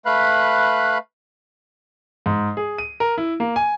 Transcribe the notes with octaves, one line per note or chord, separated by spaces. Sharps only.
A3 B4 F5 B5 F#6
G#2
G#4
D#7
A#4
E4
A#3
G#5